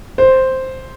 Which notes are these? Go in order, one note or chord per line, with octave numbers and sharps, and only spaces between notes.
C5